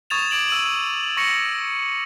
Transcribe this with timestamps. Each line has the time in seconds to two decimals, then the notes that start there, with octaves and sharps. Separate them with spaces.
0.10 C#6 D#6 G#6 A6 E7 F7
0.31 D6 G#6 D7 F#7
0.48 E6 D#7 F#7
1.17 C#6 A#6 C#7